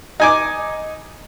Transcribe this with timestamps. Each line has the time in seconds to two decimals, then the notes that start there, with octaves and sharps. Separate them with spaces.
0.20 D#4 G#5 D6